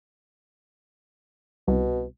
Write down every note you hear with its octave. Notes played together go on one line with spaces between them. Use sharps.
C2 B2